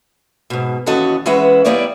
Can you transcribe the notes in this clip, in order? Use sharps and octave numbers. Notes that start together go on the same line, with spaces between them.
G#2 B2
D#2 E3 C#4 F#4 A4 D#5
E3 G#3 C#4 B4 E5 F#5
G3 A#3 B3 E4 C#5 D5